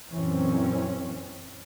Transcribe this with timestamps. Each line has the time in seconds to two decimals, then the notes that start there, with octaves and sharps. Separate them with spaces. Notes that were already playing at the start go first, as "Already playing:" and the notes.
0.12 F#2 A#2 E3 C4 C#4